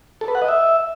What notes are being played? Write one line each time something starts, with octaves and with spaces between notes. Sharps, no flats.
A4
B4
F#5
D#5
E5